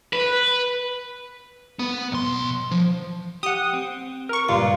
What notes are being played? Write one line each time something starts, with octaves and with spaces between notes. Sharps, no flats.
B4
B3
B1 C6
F3
G4 F#5 D#6
C4
A#4 C#6
C#2 G2 A#2 F4